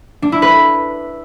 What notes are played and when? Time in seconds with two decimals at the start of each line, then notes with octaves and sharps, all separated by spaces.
0.22 D4
0.32 E4
0.42 B4